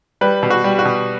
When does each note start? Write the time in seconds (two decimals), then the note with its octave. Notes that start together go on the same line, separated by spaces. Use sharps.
0.21 G3 B4
0.43 B2
0.50 F#4
0.64 G3
0.79 F#4
0.85 B2